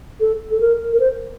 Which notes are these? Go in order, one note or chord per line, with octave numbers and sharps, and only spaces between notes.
A4
A4
A#4
A#4
C5